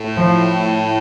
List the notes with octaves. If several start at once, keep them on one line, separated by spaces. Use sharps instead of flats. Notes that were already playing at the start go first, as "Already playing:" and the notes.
Already playing: A2
F3